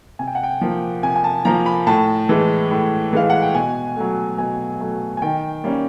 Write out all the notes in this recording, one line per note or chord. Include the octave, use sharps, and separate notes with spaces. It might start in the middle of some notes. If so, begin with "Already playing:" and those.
C3 G#5
G5
F#5
G5
F3 A#3
C3 G#5
G#5
A5
F3 A#3 A#5
B5
A2 A5
E3 G#3
A2
E3 G#3 F5
F#5
G5
B2 G#5
F#3 A3
B2 G#5
F#3 A3
G#5
D#3 G5
G3 A#3 C#4